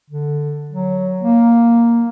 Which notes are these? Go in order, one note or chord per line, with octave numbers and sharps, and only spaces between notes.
D3
F#3
A#3